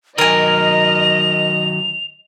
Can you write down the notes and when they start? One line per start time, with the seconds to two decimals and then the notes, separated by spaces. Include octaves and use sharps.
0.18 D#3 F#3 A#4 D#5 G#5 F7